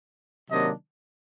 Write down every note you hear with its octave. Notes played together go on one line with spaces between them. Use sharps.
C3 D#3 F#3 A#3 D4 D#5